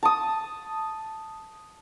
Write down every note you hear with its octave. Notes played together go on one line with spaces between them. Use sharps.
A5 D#6